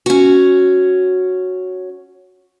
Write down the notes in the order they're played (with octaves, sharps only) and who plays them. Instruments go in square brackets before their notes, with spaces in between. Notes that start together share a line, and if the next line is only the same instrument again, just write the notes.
[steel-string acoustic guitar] C#4 F#4